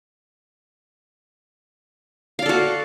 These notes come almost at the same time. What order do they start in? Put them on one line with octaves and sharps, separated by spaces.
F5 D5 A4 F#4